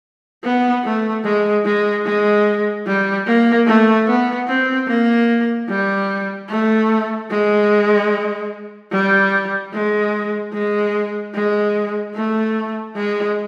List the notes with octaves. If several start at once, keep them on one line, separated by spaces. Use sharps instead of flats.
B3
A3
G#3
G#3
G#3
G3
A#3
A3
B3
C4
A#3
G3
A3
G#3
G3
G#3
G#3
G#3
A3
G#3